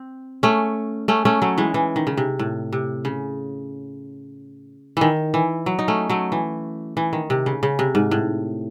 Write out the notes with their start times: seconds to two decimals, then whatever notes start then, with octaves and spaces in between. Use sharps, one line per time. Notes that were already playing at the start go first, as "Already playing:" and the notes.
Already playing: C4
0.43 A3 C#4
1.08 A3 C#4
1.25 A3 C#4
1.42 F#3 A3
1.58 E3 G#3
1.74 E3
1.96 D#3
2.07 C#3
2.17 C3
2.39 A2
2.73 C3
3.05 C#3
4.97 D#3 E3
5.34 E3
5.66 F#3
5.79 D#4
5.88 A3 C#4
6.09 F#3 A3
6.32 E3
6.97 E3
7.13 D#3
7.30 C3
7.46 C#3
7.63 C#3
7.79 C3
7.95 G#2
8.11 A2